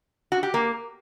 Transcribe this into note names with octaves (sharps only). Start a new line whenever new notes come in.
F#4
G4
A#3